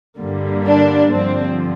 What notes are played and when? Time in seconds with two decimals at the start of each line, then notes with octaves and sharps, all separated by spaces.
0.18 G2 D3 G3 A#3
0.65 D4
1.12 G2 D3 F3 C4